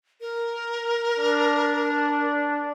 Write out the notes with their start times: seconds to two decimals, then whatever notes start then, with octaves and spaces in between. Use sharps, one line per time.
0.21 A#4
1.19 D4